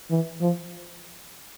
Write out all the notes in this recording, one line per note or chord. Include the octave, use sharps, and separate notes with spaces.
E3
F3